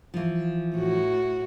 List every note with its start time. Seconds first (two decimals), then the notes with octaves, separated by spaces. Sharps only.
0.14 E3 F3
0.75 A2 F#4